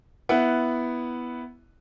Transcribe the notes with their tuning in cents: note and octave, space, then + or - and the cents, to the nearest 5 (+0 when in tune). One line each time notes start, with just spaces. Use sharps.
B3 +0 E4 +0 F#5 +0